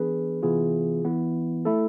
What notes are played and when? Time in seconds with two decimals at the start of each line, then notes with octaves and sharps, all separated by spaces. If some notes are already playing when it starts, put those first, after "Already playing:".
Already playing: E3 B3 D4 G#4 B4
0.43 C3 E3 B3 F4 G#4
1.04 E3 B3 E4
1.65 A3 E4 A4